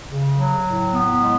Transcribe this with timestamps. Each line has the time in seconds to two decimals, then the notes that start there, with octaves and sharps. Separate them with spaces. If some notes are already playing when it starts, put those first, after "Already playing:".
0.08 C#3
0.37 F#3
0.65 A2
0.94 B3
1.23 G#3